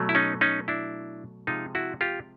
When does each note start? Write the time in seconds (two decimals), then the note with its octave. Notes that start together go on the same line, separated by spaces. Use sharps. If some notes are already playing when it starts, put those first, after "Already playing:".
Already playing: B2 F#3 A3
0.09 E4
0.15 C#4 D#4
0.41 C#4 D#4
0.68 D4 E4
1.47 C3 F3 G#3 D#4 F4
1.75 E4 F#4
2.01 F4 G4